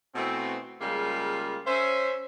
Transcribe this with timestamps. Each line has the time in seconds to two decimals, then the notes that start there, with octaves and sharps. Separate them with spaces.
0.15 B2 E3 A3 C4
0.81 C#3 G3 G#3 A#3 F4
1.67 C#4 C5 E5